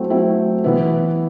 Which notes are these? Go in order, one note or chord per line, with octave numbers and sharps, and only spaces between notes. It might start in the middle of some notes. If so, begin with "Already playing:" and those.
Already playing: F#3 A3 C4 E4
F#3 A3 C4 E4
E3 B3 E4 B4